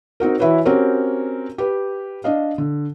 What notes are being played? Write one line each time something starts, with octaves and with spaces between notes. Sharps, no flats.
C4 D#4 F#4 A#4
E3 E4 F#4 B4 C#5
C4 C#4 F#4 G4 A#4 C#5
G4 B4
D4 D#5 F5
D3